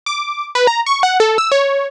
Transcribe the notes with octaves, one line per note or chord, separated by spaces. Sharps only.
D6
B4
A#5
C#6
F#5
A4
E6
C#5